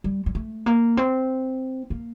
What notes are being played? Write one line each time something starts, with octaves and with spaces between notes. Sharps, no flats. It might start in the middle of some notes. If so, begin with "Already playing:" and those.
G3
G3
A3
A#3
C4
A#3